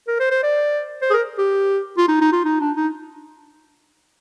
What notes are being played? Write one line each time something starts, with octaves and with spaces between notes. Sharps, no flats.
A#4
C5
C5
D5
C5
G#4
A#4
G4
F4
D#4
D#4
F4
D#4
D4
D#4